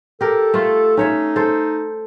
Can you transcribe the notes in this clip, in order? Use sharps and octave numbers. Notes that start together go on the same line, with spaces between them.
G4 A4 A#4
A3 F4
C#4 D#4 C#5 E5
A4 C5